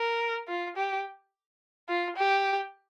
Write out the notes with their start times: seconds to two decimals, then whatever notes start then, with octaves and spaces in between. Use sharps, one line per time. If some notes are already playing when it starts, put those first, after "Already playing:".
Already playing: A#4
0.48 F4
0.77 G4
1.89 F4
2.16 G4